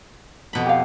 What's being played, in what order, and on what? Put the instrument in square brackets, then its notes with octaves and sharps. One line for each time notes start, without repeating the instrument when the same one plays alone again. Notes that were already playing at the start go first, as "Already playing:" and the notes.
[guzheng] F2 B2 B5
[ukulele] G4 F5